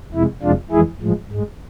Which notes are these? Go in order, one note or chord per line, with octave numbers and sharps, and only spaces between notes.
F2 C3 G#3 E4
F2 C3 F3 G#3 D4 F4
F2 E3 G#3 E4 G#4
A2 F3 G#3
G#2 G#3